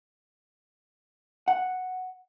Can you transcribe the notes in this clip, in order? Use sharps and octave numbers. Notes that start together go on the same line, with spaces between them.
F#5